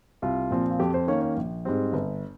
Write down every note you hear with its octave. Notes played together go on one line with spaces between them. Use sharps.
C2 F4
A#2 F3 C4
F4
F2 G4
C5
D#3 A#3 C#4 C#5
C#5
A#1
G#2 G3 C4
G1